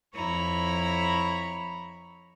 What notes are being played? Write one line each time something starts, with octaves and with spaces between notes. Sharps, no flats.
F2 E4 C#5 A#5 B5